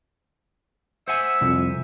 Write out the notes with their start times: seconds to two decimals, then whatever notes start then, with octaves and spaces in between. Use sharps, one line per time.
1.08 C5 E5 F#5 G#5
1.42 C2 F2